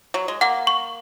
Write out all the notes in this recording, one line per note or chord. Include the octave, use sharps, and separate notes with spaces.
F#3
G#3
A#3 F#5
C#6